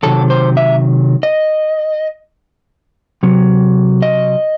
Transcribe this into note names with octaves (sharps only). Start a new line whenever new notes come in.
C3 D#3 F#3 A4
C5
E5
D#5
C3 F#3
D#5